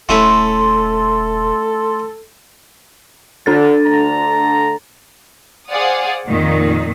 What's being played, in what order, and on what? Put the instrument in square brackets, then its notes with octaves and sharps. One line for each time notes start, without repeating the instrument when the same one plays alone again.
[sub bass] D#1 [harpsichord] A3 C#4 E4 [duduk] A4 [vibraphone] C6
[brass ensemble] D3 [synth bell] D4 A4 A6
[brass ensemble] D2 D3 A#5
[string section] G#4 C5 D5 F5 F#5 D#6
F2 A#2 D#3